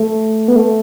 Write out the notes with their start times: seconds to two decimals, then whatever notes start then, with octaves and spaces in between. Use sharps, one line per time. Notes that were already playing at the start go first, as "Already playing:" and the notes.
Already playing: A3
0.48 B3
0.56 A3